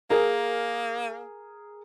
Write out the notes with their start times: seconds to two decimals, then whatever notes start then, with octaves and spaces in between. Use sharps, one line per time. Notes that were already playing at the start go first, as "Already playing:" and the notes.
0.10 A#3 G#4 A#4